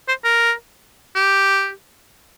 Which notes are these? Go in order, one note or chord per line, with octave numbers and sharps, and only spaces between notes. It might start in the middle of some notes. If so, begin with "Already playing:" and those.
C5
A#4
G4